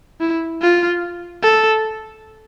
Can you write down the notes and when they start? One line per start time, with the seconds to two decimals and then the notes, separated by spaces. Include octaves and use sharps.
0.20 E4
0.62 F4
1.42 A4